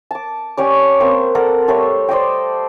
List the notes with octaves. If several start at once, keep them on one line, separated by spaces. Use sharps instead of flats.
A5 D6
C#4 G4 C#5 D5
A#3 C4 C#6
A4 A#4 D5 F#5
G3 A3 A4 C#5
C5 D5 D#5 G5